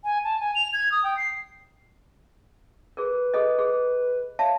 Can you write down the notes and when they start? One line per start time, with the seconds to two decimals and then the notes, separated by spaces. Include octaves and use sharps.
0.04 G#5
0.24 A5
0.40 G#5
0.55 F7
0.73 G#6
0.92 D#6
1.04 G5
1.17 C7
2.97 G#4 A#4 B4
3.34 G#4 A4 D#5
3.59 G#4
4.39 C#5 E5 F5 A5